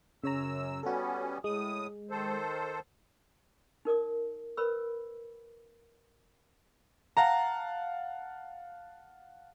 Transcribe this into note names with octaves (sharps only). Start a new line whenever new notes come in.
F#2 C#3 C#5 A#5 E6
G3 B3 C#4 F#4 A4
A2 G#3 D#6
D#3 A4 C5
D#4 A#4 D5 D#6
A#4 B4 C#5 B5 E6
F5 F#5 A5 A#5